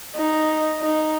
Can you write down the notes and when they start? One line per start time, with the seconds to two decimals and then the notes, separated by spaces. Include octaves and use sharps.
0.16 D#4
0.82 D#4